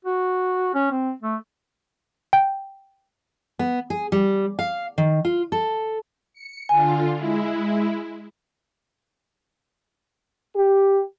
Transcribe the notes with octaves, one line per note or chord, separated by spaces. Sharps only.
F#4
C#4
C4
A3
G5
B3
G#4
G3
F5
D#3
F4
A4
C#7
D3 F4 G#5
G#3 E4
G4